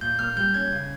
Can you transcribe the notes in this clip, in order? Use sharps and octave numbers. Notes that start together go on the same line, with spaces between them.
A#2 G6
A#3 F6
G3 G6
C#4 G#6
C#3